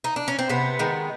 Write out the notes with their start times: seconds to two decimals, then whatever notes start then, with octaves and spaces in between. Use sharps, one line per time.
0.04 D#4
0.16 D4
0.28 C#4
0.39 C4
0.49 C3 B3
0.79 D#3 G#3